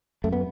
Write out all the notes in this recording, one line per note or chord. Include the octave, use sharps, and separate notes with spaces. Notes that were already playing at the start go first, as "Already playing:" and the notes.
F#2 A3
B3